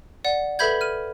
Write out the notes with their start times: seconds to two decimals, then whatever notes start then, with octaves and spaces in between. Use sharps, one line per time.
0.24 D5 F#5
0.59 A4 B4 E5 B5 G6 G#6
0.81 F6 D#7